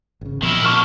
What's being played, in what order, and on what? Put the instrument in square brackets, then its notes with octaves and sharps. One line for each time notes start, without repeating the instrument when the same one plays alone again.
[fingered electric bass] G#1 C#3
[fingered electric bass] A#2 F3 B3 [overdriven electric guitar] D#3 E4
[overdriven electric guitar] B2 D3 [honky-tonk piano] C#6 F6